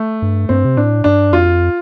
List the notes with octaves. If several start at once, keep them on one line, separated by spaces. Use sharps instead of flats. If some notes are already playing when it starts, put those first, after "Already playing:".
Already playing: A3
G2
G2 C4
C3
A2 D4
G2 D4
F2 F4